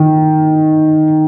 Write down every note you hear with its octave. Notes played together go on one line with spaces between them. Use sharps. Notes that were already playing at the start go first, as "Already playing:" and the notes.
Already playing: D#3